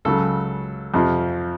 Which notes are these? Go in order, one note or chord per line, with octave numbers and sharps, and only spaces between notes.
C#2 C#3 F#3 A4
F2 C3 F3